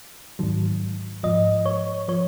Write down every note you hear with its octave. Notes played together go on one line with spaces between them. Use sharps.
G#2 D#3 F#3
G#2 F3 D#5
C#5
F3 C#5